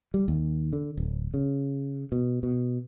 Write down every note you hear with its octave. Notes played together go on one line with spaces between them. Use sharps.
G3
D#2
D3
D1
C#3
B2
B2